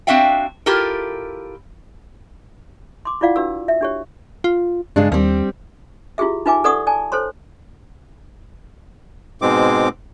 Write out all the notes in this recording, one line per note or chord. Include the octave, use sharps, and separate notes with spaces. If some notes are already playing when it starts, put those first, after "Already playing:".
C4 D4 F#4 E5 F5 G5
E4 F4 G4 A4 A#4
C6 D6
E4 F4 D5 F5 F#5
D4 F#4 B4 E6
E5
D4 G4 C#5
F4
G2 C#3 G#3 D4
D#2 G3 C4
E4 F4 G4 G#4 E5
D#4 F4 B4 E5 G#5 D6
A4 B4 D5 F#5 C#6 D#6
D5 G#5 A5
A4 C5 C#5 C6
G#2 B2 G#3 C4 D6